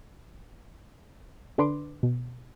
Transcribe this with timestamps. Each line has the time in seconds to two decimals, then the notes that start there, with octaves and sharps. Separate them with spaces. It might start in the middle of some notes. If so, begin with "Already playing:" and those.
1.58 D3 D4 B4 C6 D6
2.03 B2